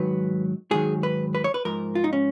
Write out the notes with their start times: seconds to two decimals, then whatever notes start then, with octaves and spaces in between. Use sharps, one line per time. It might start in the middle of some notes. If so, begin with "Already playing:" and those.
Already playing: G#2 D#3 F#3 B4
0.71 G#2 D#3 F#3 G#4
1.03 B4
1.35 B4
1.44 C#5
1.54 B4
1.65 G#2 F3 A#4
1.95 F4
2.04 D#4
2.13 C#4